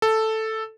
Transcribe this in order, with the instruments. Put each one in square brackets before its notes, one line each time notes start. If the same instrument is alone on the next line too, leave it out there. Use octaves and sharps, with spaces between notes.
[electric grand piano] A4